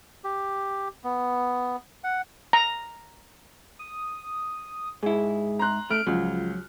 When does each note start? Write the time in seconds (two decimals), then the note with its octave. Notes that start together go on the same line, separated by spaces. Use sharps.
0.24 G4
1.04 B3
2.04 F#5
2.53 A#5
3.79 D#6
5.03 G#2 E4 G#4
5.59 A#5 C6 F#6
5.91 A3 F6 D7
6.07 C#2 F3 F#3